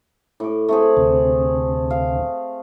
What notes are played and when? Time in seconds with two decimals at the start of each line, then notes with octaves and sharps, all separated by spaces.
0.40 A2 D6
0.68 A3 C4 G#4
0.97 D2 C3
1.90 F5